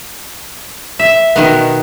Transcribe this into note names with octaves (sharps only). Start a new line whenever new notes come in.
E5
B2 D#3 B3